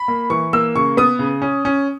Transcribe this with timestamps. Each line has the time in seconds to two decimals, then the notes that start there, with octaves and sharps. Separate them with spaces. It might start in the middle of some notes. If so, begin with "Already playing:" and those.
Already playing: B5
0.08 A#3
0.30 E3 C#6
0.53 A#3 E6
0.75 C#3 C#6
0.97 B3 D#6
1.19 C#3
1.42 C#4
1.65 C#4